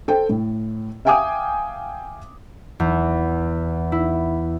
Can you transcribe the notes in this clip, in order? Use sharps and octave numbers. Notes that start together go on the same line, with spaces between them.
A4 C5 G5
A2
E5 F5 G5 G#5 D6 D#6
E2
E4